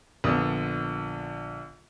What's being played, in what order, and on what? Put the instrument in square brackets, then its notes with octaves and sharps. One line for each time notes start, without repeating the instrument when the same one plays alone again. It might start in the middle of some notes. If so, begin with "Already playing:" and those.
[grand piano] A#1 D3 B3 D#6